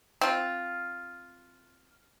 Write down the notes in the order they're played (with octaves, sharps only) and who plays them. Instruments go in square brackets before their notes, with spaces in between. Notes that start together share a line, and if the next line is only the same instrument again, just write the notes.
[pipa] C4 F4